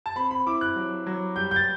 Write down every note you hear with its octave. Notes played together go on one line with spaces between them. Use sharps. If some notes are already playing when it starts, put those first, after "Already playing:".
A5
C4 B5
B5
E4 D6
F#6
F#3
F#3
G3 G6
G6
A6